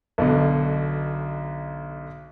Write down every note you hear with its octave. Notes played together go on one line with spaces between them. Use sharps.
B1 B2 D3